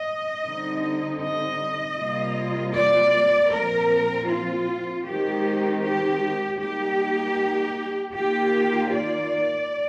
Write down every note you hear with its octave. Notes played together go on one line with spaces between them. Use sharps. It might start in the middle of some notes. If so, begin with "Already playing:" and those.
Already playing: D#5
D3 G3 C4 D#4
D#5
C3 G3 A#3 F4
D5
A#2 F3 C4 A#4
F4
D#3 G#3 C4 D#4 G4
G4
G3 A#3 D#4 G4
D#3 A#3 F4 G4
D5